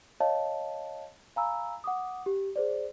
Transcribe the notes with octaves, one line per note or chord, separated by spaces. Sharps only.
C#5 D#5 F5 A5
F5 G#5 A#5 B5 E6
F#5 D6 D#6
G4
G#4 C5 D5